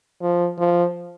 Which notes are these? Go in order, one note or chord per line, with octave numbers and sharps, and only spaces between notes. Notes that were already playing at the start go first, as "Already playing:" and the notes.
F3
F3